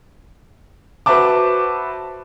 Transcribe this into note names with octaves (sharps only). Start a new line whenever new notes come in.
F#4 B4 C5 E5 A5 D6